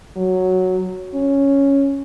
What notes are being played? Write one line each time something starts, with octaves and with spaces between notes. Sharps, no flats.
F#3
C#4